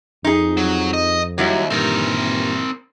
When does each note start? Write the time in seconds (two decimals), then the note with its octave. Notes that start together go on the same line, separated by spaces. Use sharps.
0.25 F2 D#4 G#4
0.57 F#3
0.94 D#5
1.38 D#2 F#3 G3 E4
1.70 G2 A#2 D#3 E3 G3 C4 A#4